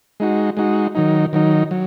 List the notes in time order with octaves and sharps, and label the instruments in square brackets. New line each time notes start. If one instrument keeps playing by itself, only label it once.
[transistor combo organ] G#3 D#4 F#4
G#3 D#4 F#4
D#3 F#3 D#4
D#3 F#3 D#4
F#3